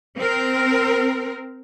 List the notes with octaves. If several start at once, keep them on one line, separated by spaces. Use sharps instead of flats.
C4 A#4